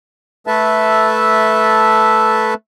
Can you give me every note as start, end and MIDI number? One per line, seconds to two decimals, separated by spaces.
0.47 2.54 57
0.47 2.54 69
0.47 2.54 71
0.47 2.54 76
0.47 2.54 81